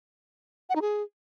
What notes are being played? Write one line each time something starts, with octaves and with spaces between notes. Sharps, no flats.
F#5
D#4
G#4